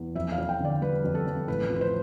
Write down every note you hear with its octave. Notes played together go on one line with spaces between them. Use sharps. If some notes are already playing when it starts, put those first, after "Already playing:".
Already playing: E2
F2 E5
F5
F2
G5
D3 D5
G3 B4
F2
A4
F2
A1 B4
F3
B4
C5